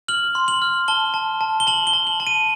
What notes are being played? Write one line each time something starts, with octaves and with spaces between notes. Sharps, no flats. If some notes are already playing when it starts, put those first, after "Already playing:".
F6 F#7
C6
F#7
F6
A5 G7
A5
A5
G7
A5 F#7
G7
A5
F#7
A5
D#7